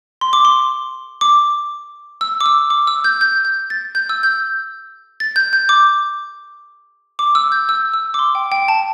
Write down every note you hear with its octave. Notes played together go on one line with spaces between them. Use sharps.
C6
D6
C6
D6
E6
D6
E6
D6
E6
G6
G6
G6
A6
G6
E6
G6
A6
G6
G6
D6
D6
E6
G6
E6
E6
D6
C6
G5
G5
A5